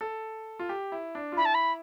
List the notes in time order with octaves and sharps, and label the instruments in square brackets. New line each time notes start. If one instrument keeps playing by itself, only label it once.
[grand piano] A4
F4
G4
E4
D4
F4
[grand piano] E4 [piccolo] B5
[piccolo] A5
B5